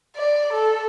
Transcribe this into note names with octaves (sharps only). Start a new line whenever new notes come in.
D5
A4